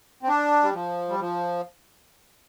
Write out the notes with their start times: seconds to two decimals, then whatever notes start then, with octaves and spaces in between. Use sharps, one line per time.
0.23 C4
0.28 D4
0.63 G3
0.74 F3
1.09 G3
1.20 F3